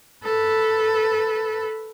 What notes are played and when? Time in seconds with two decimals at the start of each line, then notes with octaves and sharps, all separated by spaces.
0.24 A4 B4